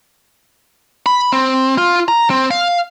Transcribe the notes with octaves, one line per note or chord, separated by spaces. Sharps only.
B5
C4
F4
A#5
C4
F5